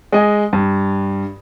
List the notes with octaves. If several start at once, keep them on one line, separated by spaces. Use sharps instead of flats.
G#3 D#5 G#5
G2